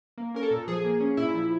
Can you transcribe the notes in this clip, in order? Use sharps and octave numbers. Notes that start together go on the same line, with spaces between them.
A#3
C#4 A#4
A4
A#2
F3 G#4
A#3
C#4
A#2 E4
F3